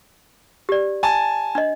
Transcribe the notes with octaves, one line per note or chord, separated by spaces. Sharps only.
G4 D5
G#5 A5
D4 D#5